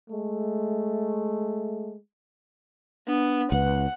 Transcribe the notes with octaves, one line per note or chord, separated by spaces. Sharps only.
G#3 A3
B3 D4
C#2 B4 F#5